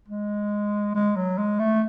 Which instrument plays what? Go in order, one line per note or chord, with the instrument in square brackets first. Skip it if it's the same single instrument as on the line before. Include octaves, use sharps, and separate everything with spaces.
[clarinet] G#3
G#3
F#3
G#3
A3